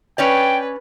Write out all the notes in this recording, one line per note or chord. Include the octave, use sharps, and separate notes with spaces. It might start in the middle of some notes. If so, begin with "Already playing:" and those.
C#4 B4 C#5 D5 G5